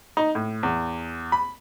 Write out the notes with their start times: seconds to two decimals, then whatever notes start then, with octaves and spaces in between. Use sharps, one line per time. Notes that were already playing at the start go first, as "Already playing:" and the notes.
0.17 D#4
0.35 A2
0.63 E2
1.32 B5